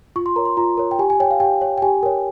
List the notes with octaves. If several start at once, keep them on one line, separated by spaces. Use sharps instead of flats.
F4 C#6
C6
A#4 C#5 A#5
C6
F4 A#5
A#4 C#5
G5
G4 G#5
G#5
C#5 G5
F5
G4 G5
C#5
G5
G4 G#5
A#4 C#5 G5